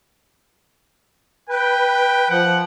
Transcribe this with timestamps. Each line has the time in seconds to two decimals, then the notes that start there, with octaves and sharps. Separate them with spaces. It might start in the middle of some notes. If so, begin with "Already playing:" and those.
1.50 B4 G5
2.30 F3 F#5